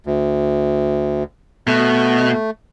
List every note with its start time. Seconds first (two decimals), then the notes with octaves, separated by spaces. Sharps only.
0.06 D2
1.67 B2 A3